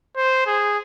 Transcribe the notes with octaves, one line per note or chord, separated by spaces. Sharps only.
C5
G#4